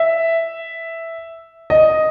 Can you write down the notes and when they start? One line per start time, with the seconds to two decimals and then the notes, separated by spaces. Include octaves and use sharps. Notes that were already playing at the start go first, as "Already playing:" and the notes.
Already playing: E5
1.70 D#5